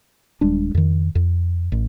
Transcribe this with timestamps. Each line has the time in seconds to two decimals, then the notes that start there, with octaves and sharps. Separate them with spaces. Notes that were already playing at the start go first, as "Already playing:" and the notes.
0.41 D#1 G3 G#3 D4
0.75 F2 D#3
1.15 F2
1.72 A1